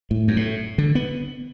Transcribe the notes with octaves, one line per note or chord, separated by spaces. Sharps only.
A2
F#2
A2
D3
B3